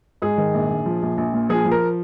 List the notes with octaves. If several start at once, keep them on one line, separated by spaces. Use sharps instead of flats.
G#2 G#4
D#3
A#1
A#1
F3
A#1
A#1
A#2
F3 G#4
F3
A#4